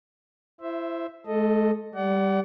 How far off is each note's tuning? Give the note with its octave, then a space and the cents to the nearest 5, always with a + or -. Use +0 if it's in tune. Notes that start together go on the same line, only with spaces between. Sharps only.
E4 +30 C5 +0 E5 +0
G#3 +45 A4 +0 D#5 +0
G3 +0 D5 -20 F#5 +30